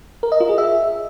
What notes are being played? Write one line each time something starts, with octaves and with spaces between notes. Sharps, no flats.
A#4
D#5
F4
G#4
E5